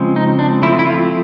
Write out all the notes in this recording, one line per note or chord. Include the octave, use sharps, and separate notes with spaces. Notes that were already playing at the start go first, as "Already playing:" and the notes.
Already playing: C#3 F3 G#3 C4
D#4
D4
F3 A3 C4 E4
E4
F4